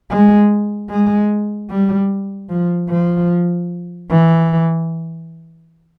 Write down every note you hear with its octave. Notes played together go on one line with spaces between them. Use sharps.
G#3
G#3
G3
F3
F3
E3